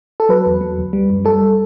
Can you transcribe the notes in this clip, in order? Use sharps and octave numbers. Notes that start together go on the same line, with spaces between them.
A4
F#3 B4
E2
F#3
D2
G3
F#2
G3 A4